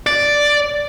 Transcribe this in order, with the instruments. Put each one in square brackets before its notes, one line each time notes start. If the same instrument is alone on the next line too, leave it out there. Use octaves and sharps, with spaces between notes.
[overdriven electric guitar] D5